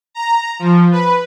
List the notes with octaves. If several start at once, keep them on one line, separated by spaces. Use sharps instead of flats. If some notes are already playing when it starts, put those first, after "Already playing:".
A#5
F3
B4